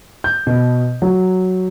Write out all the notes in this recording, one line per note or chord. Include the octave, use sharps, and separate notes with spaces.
G6
B2
F#3